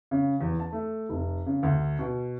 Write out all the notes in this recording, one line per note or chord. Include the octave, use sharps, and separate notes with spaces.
C#3
E2
A5
A3
F1
C#3
D2
B2